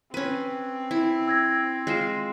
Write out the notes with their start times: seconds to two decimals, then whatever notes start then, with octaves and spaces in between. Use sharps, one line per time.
0.14 C4 C#4 B4
0.91 E4
1.28 E6 G#6 A#6
1.87 G#3 F4 A#6 C7 E7